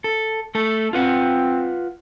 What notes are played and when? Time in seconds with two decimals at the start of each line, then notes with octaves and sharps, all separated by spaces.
0.04 A4
0.55 A3 A4
0.93 C4 F4 B4 F#5